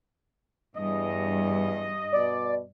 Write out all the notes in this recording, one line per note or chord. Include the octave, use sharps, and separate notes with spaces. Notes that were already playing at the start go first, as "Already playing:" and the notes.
E2 G2 D#5
B2 D5